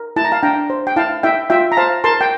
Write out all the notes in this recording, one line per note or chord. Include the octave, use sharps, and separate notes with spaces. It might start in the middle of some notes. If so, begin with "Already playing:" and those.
Already playing: A#4
E4 A5
A#5
F5 A5
D4 G5 A#5
C5
G5
E4 F5 A5
E4 E5 G5
F4 E5 G5
A#5
C5 F5 A5
A#4 A5 C6
G5